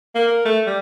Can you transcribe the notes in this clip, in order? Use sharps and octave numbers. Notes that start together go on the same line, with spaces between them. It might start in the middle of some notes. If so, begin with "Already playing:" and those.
A#3
A#4
A3
G3